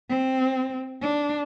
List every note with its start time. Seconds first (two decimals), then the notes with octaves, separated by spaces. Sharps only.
0.10 C4
1.01 D4